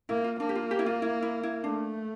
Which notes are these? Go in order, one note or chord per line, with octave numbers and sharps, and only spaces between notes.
A#3 E4
F4
A#3 D4
G4
F4
G4
E4
F4
E4
E4
E4
A3 D4